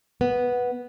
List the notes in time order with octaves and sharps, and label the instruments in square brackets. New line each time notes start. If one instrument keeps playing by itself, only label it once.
[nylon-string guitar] B3